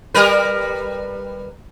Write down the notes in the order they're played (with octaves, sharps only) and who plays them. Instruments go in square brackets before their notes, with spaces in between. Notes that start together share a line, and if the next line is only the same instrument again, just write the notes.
[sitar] G3 A#4 B4